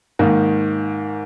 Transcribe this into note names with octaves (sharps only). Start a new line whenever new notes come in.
G#2 D#3 A#3